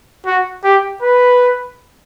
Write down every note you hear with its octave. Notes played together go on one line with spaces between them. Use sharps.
F#4
G4
B4